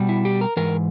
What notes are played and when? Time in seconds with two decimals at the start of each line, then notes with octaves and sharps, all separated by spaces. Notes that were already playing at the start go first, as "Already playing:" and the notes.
Already playing: B2 G3
0.09 E4
0.25 G4
0.41 A#4
0.57 G#2 E3 A#4